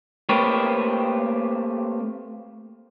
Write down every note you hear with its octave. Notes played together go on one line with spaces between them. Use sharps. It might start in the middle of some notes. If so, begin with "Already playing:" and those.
A3 A#3 C4 G4 B4 C#5